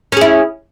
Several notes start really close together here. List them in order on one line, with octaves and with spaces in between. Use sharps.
C#4 G#4 E4